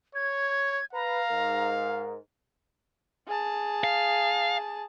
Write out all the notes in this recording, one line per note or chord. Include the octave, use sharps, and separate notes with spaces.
C#5 G#6
B4 F5 A#5
G#2 A#4
G#4 A5
F5